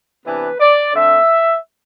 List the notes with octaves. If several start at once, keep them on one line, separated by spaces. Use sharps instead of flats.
C3 E3 B3 D4 B4
D5
D3 A3 C4 E5